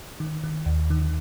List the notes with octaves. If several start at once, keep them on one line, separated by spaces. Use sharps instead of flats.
D#3
D#3
D#2
D#3